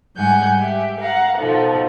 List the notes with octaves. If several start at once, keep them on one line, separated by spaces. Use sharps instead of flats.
G#2 G3 F#5 G#5 G6
G4 E5
F5 F#5 A#5
B2 F3 D#4 A4